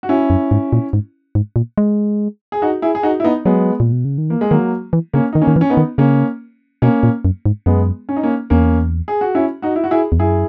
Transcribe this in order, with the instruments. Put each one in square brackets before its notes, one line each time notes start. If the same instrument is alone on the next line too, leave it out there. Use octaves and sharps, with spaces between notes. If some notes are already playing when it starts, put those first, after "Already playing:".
[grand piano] F#4
C#4 E4
[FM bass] F#2
G#2
A#2
G#2
G#2
A#2
G#3
[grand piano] G#4
D#4 F#4
E4 G#4
G#4
D#4 F#4
E4
B3 D#4
[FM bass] F#3 [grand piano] G#3 B3
[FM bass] A#2
B2
C#3
D#3
[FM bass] E3 [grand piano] A#3
[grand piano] G#3
[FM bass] D#3 [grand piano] F#3 A#3
[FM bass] E3
[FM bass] C#3 [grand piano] A#3 C#4
[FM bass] D#3 [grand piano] D#4
[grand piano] A#3 C#4
[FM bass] D#3
E3
[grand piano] C#4
B3 D#4
[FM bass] D#3
[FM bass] C#3 [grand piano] A#3 C#4
[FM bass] B2 [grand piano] A#3 C#4
[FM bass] A#2
F#2
G#2
[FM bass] F#2 [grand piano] G#3 B3
[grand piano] C#4
D#4
A#3 C#4
[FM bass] E2 [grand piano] A#3 C#4
[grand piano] G#4
F#4
C#4 E4
D#4 F#4
E4
F#4
E4 G#4
[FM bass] E2
[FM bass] F#2 [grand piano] E4 G#4